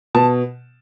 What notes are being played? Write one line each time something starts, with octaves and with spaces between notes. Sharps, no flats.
B2 A5